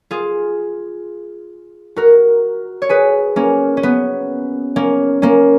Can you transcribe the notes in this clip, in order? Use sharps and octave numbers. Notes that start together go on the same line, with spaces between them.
F4 G#4
F#4 A#4
C#5
G#4 B4
A#3 C#4
C#4
B3
A#3 C#4
A#3 C#4